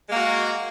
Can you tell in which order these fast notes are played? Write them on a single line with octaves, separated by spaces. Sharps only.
G#3 A#3 F#4